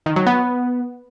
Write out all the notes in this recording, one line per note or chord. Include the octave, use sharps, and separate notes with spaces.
D#3
F#3
B3